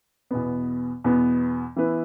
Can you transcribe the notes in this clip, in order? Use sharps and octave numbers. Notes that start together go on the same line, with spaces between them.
E2 B2 B3
E2 B2 B3
E3 B3 E4 B4